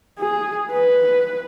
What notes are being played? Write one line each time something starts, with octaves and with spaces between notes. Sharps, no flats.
G#4
B4